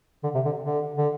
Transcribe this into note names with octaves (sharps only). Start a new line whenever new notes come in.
D3
C3
D3
D3
D3